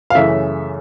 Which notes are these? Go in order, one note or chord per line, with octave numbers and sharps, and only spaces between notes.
F5
F#2 C#3 E3 A3 E5